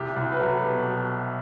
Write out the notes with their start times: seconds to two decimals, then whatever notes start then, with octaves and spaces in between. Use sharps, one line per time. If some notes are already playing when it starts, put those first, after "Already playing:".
Already playing: C2 G4
0.16 C2
0.32 B4
0.40 F#3 A4
0.63 B2 G4